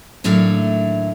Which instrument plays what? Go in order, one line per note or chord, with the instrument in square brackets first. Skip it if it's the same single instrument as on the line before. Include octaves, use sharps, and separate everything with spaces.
[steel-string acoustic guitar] D#2 A2 F#3 A3 D4 F5